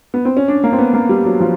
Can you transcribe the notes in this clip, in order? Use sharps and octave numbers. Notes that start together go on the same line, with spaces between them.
B3
C4
C#4
D4
A#3
C4
B3
A#3
G3
F#3
F3